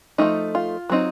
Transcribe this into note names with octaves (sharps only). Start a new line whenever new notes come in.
F3 A3 D#4
F4
F#3 C4 D#4